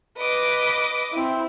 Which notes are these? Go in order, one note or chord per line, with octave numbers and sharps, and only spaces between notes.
B4 D#5 D6
C4 E4